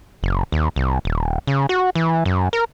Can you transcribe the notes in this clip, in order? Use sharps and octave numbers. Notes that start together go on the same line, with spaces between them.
F#1
D#2
C2
D#1
C#3
F#4
E3
F#2
A#4